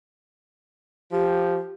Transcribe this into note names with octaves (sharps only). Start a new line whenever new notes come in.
F3 G4